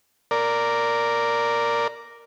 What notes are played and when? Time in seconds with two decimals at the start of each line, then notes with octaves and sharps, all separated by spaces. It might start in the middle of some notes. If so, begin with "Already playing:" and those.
0.31 A#4 D5